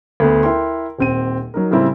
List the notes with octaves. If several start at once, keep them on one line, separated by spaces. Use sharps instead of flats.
D2 A3 B3
E4 A#4 G5 C6
D#1 C4 D#7
F#3 D#4 A#4
A2 C#3 G3 C4 E4